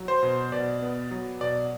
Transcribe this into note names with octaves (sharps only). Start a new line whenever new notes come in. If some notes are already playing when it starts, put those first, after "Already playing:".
Already playing: F#3
C5
B2
B2 D5
B3
F#3
B2 D5